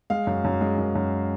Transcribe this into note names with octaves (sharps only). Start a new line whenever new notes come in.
G#3 F5
F#2
F#2
G#3
F#2
F#2